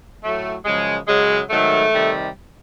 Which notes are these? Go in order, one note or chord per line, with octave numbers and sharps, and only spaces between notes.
A2 F#3 A3
F#2 C#3 F3 G#3
F#2 C#3 F#3 G#3
G#2 D#3 F#3 A3
C3 D#3 G3